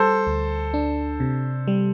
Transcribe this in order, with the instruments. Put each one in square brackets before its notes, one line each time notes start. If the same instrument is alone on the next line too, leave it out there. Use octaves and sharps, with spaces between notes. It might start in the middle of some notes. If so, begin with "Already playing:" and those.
Already playing: [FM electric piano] G3 [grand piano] A4 C5
[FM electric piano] D2
D4
C3
G3